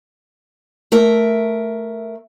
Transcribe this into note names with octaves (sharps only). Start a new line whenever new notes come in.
A3 A#4 E5